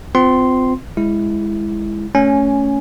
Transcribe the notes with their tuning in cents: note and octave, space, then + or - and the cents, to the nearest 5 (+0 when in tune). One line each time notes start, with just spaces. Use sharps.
C4 -30 F4 +15 C6 +0
G#3 -10 E4 +0
A3 +5 C#4 +10 G#5 +0